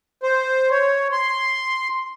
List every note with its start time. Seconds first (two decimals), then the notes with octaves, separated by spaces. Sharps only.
0.23 C5
0.71 C#5
1.12 C6